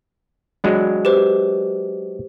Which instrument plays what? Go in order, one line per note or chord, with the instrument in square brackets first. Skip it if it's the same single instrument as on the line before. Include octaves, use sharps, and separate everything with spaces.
[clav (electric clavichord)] F#3 G#3 D4
[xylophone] G4 B4 C5